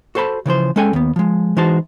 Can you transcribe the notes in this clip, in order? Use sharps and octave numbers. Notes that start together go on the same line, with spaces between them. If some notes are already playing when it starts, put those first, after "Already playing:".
F#4 A4 C5 A5 B5
C#3 E3 F3 C5
G#3 C#4 A4 G5 G#5
D#2 B3
F3 G#3
E3 G#3 D#4 F#4 C5 A5